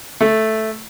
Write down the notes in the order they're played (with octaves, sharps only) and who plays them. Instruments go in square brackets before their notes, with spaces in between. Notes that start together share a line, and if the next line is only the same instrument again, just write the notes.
[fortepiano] A3